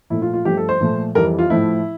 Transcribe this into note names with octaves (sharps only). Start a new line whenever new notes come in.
A#2 F3 A3 E4
F4
F4
G2 F3 A3 G4
A4
C5
A#2 F3 A3
F2 E3 G3 A#4
F4
A2 F3 A3 E4